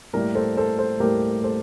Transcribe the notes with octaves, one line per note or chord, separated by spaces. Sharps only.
A2 G3 A#3 G4 A#4
A4 C5
A4 C5
A4 C5
A2 G3 A#3 G4 A#4
A4 C5